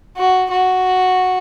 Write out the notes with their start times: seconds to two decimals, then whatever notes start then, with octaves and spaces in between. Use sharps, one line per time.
0.17 F#4
0.50 F#4